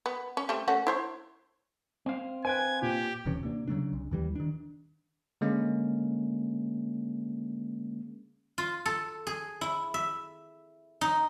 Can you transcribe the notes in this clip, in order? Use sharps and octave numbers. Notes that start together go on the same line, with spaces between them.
B3
C#4
G3 A3 C4
A3 C#4 F#4
E4 C5 C#5
C4 F5
B4 C5 G5 G#5 G#6
A#2 G4
D#1 C3 E3 C#4
C3 A#3 D4
C#3 F#3 A3 D4
C2
D#2 E3 G3
D#3 D4
D3 G#3 A#3 C#4
F4
A4
G#4
E4
E5
D#4